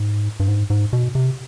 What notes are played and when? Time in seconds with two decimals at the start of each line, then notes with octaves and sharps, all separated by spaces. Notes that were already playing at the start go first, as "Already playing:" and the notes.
Already playing: G#2
0.40 G2
0.48 G#2
0.70 G#2
0.93 B2
1.15 C3